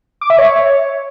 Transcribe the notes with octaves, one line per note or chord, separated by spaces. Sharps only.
D6
E5
C#5